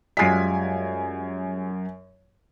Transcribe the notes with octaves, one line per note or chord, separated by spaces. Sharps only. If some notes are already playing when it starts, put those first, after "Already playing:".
F#2 G3 G#3 F4 G#5 B6